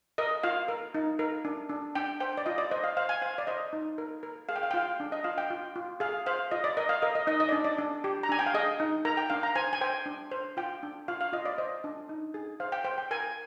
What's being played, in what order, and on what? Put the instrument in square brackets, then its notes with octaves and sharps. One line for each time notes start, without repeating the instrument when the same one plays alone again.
[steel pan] A#4 D#5
F4 F5
A#4
D#4
A#4
D4
D4
D4 G5
C5 G5
D5
F4 D#5
D5
C5 D#5
F5
C5 F5
G#5
C5 F5
D5
C5 D#5
D#4
A#4
A#4
G#4 F5
G5
F5
G5
F4 F5
D4
D#5
F4 F5
G5
F4
F4
G#4 F5
C5 F5
F4 D#5
D5
A#4 D#5
F5
A#4 D#5
D#5
D#4 D#5
D#5
D5
D4
D5
D4
G4
A#5
D4 G#5
G5
F5
G#4 D#5
D#4
A#4 A#5
G5
D4 F5
A#5
C5 G#5
G#5
C5 G5
D4
C5
F4 G5
D4
F4 F5
F5
F4 D#5
D5
C5 D#5
D4
D#4
G#4
C5 F5
G5
C5 G5
G5
A#4 G#5